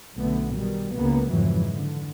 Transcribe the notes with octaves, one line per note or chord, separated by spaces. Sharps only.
B1 D3 A3 B3
B2 D#3 G3
C#2 A#3 B3
F2 G#2 C#3 E3 F#3
D3